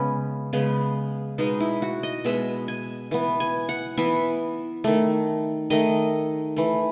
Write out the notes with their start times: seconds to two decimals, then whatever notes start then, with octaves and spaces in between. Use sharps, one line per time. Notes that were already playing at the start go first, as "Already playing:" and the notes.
Already playing: C#3 G#3 B3 C#4
0.53 C#3 G#3 B3
1.38 B2 G#3 B3 D#4
1.60 E4
1.82 F#4
2.03 D#5
2.25 B2 G#3 B3 E5
2.68 G#5
3.11 E3 B3
3.40 G#5
3.69 F#5
3.97 E3 B3 E5
4.84 D#3 A3
5.70 D#3 A3 D#5
6.56 E3 A3